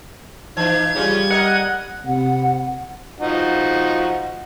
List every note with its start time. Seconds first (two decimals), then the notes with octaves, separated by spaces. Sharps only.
0.57 E3 D#4 G#6
0.95 C#3 G3 C#4 F4
1.30 A#4 D#5 F#5
2.06 C3 F#5
3.20 F3 D#4 F#4